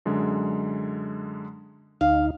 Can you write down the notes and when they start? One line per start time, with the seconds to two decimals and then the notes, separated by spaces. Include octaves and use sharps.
0.06 F#2 D3 G#3
2.01 D2 D#4 F5